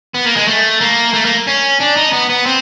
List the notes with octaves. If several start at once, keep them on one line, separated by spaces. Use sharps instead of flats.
B3
A#3
G#3
A3
A#3
A3
A#3
C#4
D4
D#4
B3
B3
C4